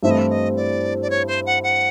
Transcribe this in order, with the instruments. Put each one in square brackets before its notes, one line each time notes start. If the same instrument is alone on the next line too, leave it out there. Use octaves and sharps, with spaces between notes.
[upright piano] G2 E3 A3 C4 E4 [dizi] E5
[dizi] D#5
E5
D#5
D5
D5
C#5
C5
F#5
F#5